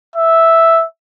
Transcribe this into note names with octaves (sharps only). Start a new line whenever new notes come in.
E5